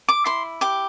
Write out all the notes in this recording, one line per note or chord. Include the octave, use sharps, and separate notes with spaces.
D6
E4 C6
G4 D6